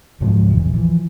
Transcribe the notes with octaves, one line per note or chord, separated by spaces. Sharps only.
C#2 G#2 F3 F#3
E1 A#1 E3
E3 F3